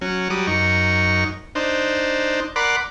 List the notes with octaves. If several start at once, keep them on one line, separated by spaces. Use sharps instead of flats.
F#3 C#4
F#3 G3 D6 D#6
F#2 D#4 C#6
D4 D#4 C5
A#4 D5 F#5 B5 C6 D6